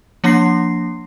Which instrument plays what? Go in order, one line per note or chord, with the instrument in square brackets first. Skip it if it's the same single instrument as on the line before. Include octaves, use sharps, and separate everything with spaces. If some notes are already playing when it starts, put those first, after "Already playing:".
[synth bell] F3 A#3 D4 C6 A#6 C7